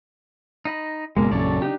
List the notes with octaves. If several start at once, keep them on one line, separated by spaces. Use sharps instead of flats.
D#4 D#5 B5
F#1 B2 G#3 A#3
A#1 F#2 C#3 A4 C#5 D5
D4 D#4 G4